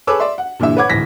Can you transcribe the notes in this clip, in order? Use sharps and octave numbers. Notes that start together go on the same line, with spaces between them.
G#4 A4 B4 C#5 D6 E6
D5 E5 C6
F#5
G2 A#2 D3 E3 E5
B4 C#5 F#5 D6 G#6
D1 G#2 E3 A#6 B6